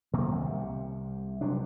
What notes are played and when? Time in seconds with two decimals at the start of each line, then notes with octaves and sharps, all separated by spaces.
0.13 B1 C3 D#3 A#3
0.42 C2 C3
1.41 F1 C3 F#3 D4